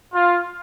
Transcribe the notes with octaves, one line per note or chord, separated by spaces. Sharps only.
F4